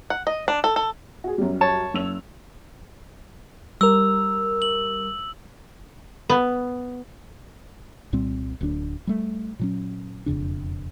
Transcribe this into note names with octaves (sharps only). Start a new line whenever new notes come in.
F#5
D#5
D4
A4
A4
F#4 G#4
F#2 F#3 G3
C#5 A5
F#1 E6 F7
G3 A#4 E6
F#7
B3
C2 A#2 G3 C4
D1 D2 C#4 D4
G3 A3
A#2 F#3 C#4
E1 F2 C#3 D4